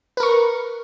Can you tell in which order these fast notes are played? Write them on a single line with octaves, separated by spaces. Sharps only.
B4 A#4 C#6